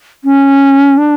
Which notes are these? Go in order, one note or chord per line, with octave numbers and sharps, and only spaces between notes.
C#4
D4